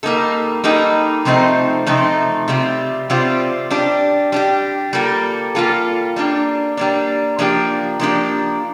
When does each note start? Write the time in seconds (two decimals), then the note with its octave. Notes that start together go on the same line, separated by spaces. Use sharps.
0.03 G3 A#3 D#4 A4
0.64 G3 A#3 D#4 A4
1.25 C3 F3 A3 C4 D#4
1.86 C3 F3 A3 C4 D#4
2.48 C3 G3 C4 F4
3.10 C3 G3 C4 F4
3.71 G3 D4 G4
4.32 G3 D4 G4
4.93 G3 A#3 F4 A4
5.55 G3 A#3 F4 A4
6.16 G3 A#3 D4
6.77 G3 A#3 D4
7.39 F3 A#3 D4 G4
8.00 F3 A#3 D4 G4